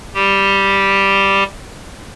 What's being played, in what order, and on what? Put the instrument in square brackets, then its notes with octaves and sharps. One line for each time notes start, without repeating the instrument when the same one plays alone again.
[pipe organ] G3 G4